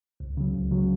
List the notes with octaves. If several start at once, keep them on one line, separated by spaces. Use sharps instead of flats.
C#2
C#3 F#3
C#2
C#3 F#3